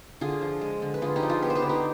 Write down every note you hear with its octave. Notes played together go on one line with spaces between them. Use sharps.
D3 F4 G#4
F3
G#3
D3
B4
D3 F4 G#4
D#4 G4
F3
F4 G#4
B3 G4 B4
C5
G4 B4
D3
D#4 G4